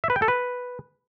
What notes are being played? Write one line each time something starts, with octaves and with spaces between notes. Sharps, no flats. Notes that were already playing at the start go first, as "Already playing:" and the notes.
E5
B4
G5
A4
B4